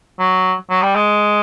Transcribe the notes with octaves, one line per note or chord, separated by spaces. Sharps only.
F#3
F#3
G3
G#3